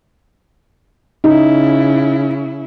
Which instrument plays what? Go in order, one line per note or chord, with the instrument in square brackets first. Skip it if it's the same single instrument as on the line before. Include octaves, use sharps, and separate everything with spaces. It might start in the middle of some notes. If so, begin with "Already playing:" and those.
[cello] C#3 E4 [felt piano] D#4